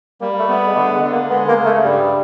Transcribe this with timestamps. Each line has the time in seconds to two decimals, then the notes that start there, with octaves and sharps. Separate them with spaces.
0.21 G3 A#3
0.40 A3
0.49 B3
0.67 G#3
0.75 D3 A3
0.94 G#3
1.03 D3
1.12 A#3
1.30 G#3 B3
1.48 A#3
1.57 C#3
1.66 A3
1.84 G2 G3